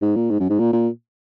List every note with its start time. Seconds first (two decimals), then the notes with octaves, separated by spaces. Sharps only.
0.02 G#2
0.16 A#2
0.31 G#2
0.40 F#2
0.50 G#2
0.59 A#2
0.73 A#2